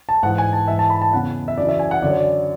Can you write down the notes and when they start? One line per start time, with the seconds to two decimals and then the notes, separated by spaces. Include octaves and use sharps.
0.09 A5
0.23 G#2 E3 F#5
0.38 G#5
0.53 A5
0.68 G#2 E3 E5
0.79 A5
0.90 B5
1.02 A5
1.12 E2 C#3 E3 F#5
1.48 E5
1.57 F#2 C#3 E3 D5
1.69 E5
1.79 G#5
1.91 F#5
2.02 F#2 D3 D5
2.10 C#5
2.17 D5